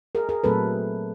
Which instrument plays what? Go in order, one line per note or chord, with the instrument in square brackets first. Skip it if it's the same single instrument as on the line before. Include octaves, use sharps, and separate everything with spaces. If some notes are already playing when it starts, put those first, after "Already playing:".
[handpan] G#4 A#4
G#4 A#4
A#2 F#3 A3 C4 A4 B4